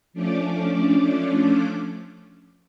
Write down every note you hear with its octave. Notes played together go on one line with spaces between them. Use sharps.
F3 A3 C#4 D4 D6